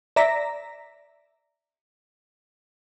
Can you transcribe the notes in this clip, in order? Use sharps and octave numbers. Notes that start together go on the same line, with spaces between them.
D5 E5 A#5 A#6 B6